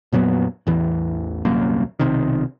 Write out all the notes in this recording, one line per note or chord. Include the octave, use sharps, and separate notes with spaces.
F2 A#2 F#3 B3
A1 E2 E3
D#1 C2 F#2 A#3
B1 C3 D#3